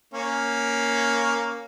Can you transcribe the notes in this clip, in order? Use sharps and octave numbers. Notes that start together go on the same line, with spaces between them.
A#3 C#4